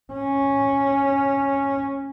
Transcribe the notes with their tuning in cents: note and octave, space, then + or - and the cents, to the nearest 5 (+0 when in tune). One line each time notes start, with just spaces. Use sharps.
C#4 -5